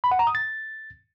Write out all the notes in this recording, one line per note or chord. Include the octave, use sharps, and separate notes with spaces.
B5
F#5
A#5
D#6
A6